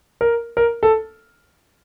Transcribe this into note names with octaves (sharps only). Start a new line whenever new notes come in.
A#4
A#4
A4